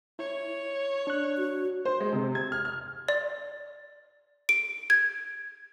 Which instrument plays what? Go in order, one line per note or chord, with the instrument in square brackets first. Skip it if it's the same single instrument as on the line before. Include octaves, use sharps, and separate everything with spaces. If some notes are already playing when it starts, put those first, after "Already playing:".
[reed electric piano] E4 [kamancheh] C#5
[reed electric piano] D4 F#6
[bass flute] F#4
[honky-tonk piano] C5
G#3
C3
G#6
F6
F6
[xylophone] D5
D7
G#6